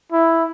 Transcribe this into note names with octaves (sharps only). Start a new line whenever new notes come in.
E4